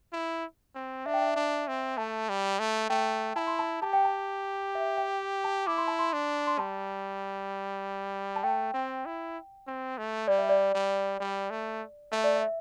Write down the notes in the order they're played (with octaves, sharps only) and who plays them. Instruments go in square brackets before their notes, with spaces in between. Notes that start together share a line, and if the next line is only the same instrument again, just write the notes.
[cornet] E4
C4
[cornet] D4 [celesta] E5
[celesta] G5
E5
[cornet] D4
C4
[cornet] A3 [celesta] A5
[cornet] G3
A3
[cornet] A3 [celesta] G5
[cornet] E4 [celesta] A5
[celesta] C6
A5
[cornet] G4 [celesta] A5
[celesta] G5
A5
E5
G5
A5
[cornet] E4 [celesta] D6
[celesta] C6
A5
C6
[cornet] D4
[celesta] C6
[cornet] G3 [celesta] A5
[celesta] A5
[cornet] A3 [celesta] G5
[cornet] C4
E4
C4
A3
[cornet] G3 [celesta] D5
[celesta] E5
D5
[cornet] G3
G3
A3
[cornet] A3 [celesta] E5
[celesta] D5
E5